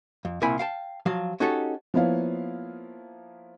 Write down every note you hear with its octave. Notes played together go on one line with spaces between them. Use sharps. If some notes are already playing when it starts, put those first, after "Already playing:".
F2
C2 A#2 C4 E4 G#5 B5
F5 G5 A5
F3 F#3 F5
C#4 D#4 F#4 G4 A4 C#5
F3 A#3 B3 E4 C#5 F5